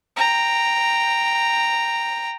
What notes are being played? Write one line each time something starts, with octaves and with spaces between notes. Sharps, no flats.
G5 A#5